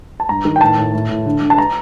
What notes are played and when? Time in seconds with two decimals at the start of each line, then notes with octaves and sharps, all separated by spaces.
0.20 A5
0.29 G2 A#5
0.45 D#3
0.56 G5
0.61 A2 A5
0.78 A2
0.93 A2
1.09 A2
1.26 D3
1.42 D3
1.50 A5
1.58 A#5